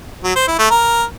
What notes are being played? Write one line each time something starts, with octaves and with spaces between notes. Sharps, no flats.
F#3
C5
E4
A3
A#4